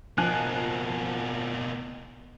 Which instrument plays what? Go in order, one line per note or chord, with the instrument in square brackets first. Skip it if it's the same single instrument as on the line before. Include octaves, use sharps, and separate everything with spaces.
[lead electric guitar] B2 A#3 [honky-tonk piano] F3 G#5 F#6